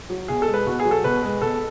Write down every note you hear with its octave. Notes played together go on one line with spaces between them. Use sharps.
F#3
B2 G#4
A4
G#3
B4
B2 F#4
G#4
F#3
A4
B2 B4
G#3
B2 A4